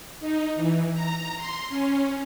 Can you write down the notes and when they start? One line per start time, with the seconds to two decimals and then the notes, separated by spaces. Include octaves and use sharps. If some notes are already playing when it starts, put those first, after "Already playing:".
0.20 D#4
0.56 E3
0.93 A#5
1.37 C6
1.69 C#4